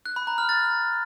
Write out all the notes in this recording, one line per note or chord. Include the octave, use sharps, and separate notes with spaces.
F#6
B5
A#5
F6
A6